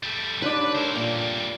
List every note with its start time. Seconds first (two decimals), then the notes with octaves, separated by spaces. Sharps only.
0.03 G3 A3
0.42 C#3 D4 D#4 G4 B4 C#5 D5
0.75 A3 E4 A#4 C5
0.95 A#2 G3 A#3